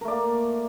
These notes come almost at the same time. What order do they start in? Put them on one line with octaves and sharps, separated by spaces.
A#4 A3 D5 A#3